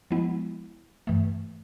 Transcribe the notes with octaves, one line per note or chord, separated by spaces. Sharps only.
F3 G#3 B3 E4
G2 E3 A3